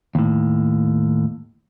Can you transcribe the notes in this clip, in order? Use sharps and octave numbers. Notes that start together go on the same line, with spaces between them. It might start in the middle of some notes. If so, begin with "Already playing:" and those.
D#2 A2